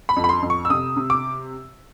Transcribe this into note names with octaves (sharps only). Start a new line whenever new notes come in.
B5
F2
B5
C6
F2
C#6
E6
C3 D#6
C3
D6